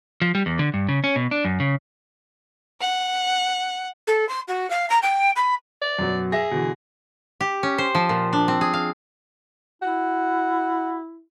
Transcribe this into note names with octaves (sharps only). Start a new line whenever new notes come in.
F3
G3
E2
D3
G2
C#3
C#4
B2
D4
F#2
C#3
F#5
A4
C6
F#4
F5
A#5
G5
B5
D5
F#2 B2 F#3
G#4 E5 A#6
B2 D3 E3
G4
C#4
C5
F3
A#2
D4
C4
G#4
F5
E4 F#4